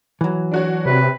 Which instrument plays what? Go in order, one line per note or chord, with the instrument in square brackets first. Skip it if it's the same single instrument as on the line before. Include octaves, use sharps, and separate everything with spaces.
[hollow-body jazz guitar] E3 F#3
[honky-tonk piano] D4 F#4 C#5
[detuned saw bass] C3 [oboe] B4